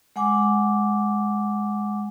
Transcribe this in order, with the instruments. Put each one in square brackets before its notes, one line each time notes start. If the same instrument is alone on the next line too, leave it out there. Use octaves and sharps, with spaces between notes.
[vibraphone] G#3 F#5 G#5 D6